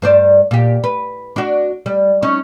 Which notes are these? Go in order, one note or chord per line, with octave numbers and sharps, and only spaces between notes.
G2 C5 D5
A#2 G4
B4
D4 F#4
G3
C#4 D#4